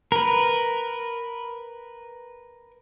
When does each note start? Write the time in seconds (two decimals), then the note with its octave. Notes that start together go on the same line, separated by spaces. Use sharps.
0.12 A#4 B4